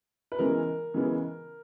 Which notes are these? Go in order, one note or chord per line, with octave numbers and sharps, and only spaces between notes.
B4
C#3 E3 G#3 B3 A#4
C#3 E3 G#3 B3